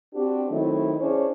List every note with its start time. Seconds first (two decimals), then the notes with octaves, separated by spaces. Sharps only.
0.14 C4 D4 F#4 G4
0.49 D#3 F#3 A3 C4 D#4 E4
1.00 C#4 D4 E4 G#4 C5 C#5